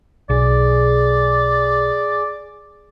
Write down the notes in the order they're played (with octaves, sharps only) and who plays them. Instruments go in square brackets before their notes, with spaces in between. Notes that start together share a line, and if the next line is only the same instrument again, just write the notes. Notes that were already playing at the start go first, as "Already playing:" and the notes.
[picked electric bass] B1 [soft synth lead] G#4 [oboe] D5